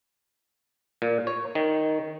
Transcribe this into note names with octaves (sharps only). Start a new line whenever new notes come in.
A#2
C#5
D#3